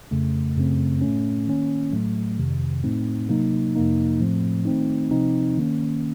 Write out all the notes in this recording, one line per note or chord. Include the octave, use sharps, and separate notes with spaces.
F2 C#3 A3
F#2 C#3 A3 C4
A2 A3 C#4
D#3 A#3 C#4
A2 F#3 A3
F2 C3 D#3
A2 A3 C4 D#4
C3 F#3 A#3 D#4
F2 C3 F3 A#3 D#4
A2 F3 A3 C4
D#3 A3 C4 D#4
C3 F3 C4 D#4
D#3 A#3 C#4